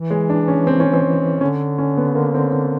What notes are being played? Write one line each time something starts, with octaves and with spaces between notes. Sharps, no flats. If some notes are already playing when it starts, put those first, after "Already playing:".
Already playing: E3
G#3
D4
C#4
C4
C#4
C4
D3 C#4
C#4
B3
A#3
C4
C4